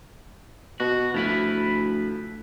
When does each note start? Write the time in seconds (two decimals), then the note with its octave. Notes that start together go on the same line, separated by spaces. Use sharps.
0.80 B2 F#4
1.14 D2 F3 E4 B4